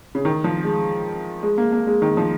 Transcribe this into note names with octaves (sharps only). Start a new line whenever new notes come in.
C#3
D#3
F3
G#3
G#3
A#3
A#3
G#3
D#3
F3